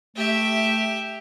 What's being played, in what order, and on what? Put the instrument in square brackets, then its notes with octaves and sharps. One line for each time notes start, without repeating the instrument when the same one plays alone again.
[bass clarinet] A3 [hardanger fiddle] G4 E5